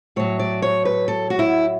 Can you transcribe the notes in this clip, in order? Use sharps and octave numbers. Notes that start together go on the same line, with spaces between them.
A2 F#3 C#5
D5
C#5
B4
A4
F#4
E4